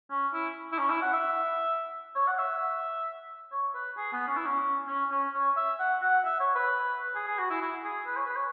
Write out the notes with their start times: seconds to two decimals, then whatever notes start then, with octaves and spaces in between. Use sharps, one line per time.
0.11 C#4
0.34 E4
0.72 E4
0.79 C#4
0.90 E4
1.02 F#5
1.13 E5
2.15 C#5
2.28 F#5
2.39 E5
3.52 C#5
3.75 B4
3.97 G#4
4.13 B3
4.28 C#4
4.37 E4
4.47 C#4
4.88 C#4
5.11 C#4
5.34 C#5
5.57 E5
5.80 F#5
6.02 F#5
6.25 E5
6.40 C#5
6.56 B4
7.16 G#4
7.28 G#4
7.39 F#4
7.50 E4
7.62 E4
7.84 G#4
8.07 B4
8.17 C#5
8.26 B4
8.36 C#5